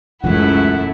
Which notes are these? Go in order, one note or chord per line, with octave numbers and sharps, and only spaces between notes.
E1 C#2 F#2 E3 A3 C#4 E4 F#5